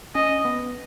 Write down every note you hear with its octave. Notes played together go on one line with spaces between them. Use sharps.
C#4 D#5
B3